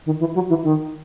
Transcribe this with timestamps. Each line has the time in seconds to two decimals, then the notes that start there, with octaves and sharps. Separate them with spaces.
0.05 D#3
0.19 E3
0.34 F#3
0.49 E3
0.63 D#3